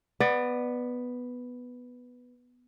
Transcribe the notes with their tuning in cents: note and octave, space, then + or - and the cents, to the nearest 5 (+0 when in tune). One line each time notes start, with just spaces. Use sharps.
B3 +0 D5 +25